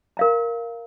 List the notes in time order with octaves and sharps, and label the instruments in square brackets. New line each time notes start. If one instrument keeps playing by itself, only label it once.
[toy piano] A#4 F5 A#5